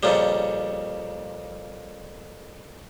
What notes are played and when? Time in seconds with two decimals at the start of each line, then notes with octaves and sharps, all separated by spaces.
0.03 F2 A#2 C#3 G3